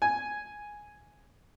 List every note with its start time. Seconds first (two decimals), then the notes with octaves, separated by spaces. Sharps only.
0.02 G#5